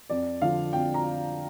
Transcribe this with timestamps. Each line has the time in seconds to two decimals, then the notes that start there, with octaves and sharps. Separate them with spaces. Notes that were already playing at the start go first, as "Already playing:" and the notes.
0.10 F2 D5
0.42 D3 F3 F5
0.73 F2 G5
0.94 A#5